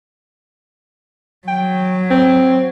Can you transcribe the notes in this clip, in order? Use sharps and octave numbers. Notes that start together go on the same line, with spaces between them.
F#3 G5
C4